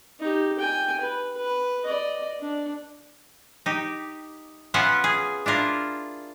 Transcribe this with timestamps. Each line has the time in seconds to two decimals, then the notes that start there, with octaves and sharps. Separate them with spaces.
0.20 D#4 G4
0.59 G5 G#5
1.01 B4
1.37 B4
1.84 D5 D#5
2.41 D4
3.66 D#4 G4
4.74 B3 C#4 F4 E5 F#5
5.04 G#4
5.46 D4 E4 F4 A#4